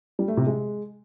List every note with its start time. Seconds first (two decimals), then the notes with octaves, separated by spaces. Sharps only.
0.19 G3
0.28 A3
0.37 C3
0.47 G#3